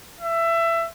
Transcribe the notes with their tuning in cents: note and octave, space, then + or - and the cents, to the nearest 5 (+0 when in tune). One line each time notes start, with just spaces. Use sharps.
E5 +20